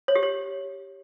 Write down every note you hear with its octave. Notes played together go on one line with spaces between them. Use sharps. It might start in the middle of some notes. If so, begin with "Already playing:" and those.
C#5
G4
C#5